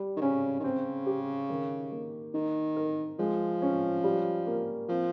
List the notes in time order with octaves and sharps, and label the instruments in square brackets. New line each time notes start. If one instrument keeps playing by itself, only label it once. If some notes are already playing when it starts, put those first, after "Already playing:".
Already playing: [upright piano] G3
[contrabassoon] D#3
[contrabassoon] C#3 [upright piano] C#4
[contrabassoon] D#3
[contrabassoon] C#3 [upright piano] C4
[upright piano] G4
D#3
A#3
[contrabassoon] D#3 [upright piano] D#4
[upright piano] A#4
[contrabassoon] F3 [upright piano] G#3
[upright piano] C#4
G3
A#3
[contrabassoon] F3 [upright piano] C4